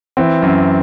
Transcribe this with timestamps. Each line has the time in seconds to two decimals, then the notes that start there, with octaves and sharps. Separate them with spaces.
0.17 E3 C4
0.42 F#2